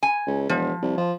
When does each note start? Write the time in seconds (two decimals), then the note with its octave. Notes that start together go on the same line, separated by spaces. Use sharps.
0.03 G#5
0.27 C#2
0.49 E1 F3
0.82 C2
0.98 F3